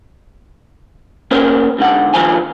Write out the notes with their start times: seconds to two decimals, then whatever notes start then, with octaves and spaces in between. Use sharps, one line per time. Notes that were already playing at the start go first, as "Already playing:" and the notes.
1.31 A#3 C#4 A#4 C5 C#5
1.78 G#2 D3 F#5
2.14 D#2 D#3 F3 D4 C5 G#5